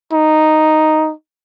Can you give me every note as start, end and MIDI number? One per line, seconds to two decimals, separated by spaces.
0.13 1.13 63